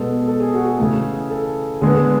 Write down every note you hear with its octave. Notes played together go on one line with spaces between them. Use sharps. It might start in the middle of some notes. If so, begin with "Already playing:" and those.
Already playing: B2 G#3 B3 A4
A4
G#4
F#4
G#4
C#3 E3 A3
A4
D3 G#3 B3 G#4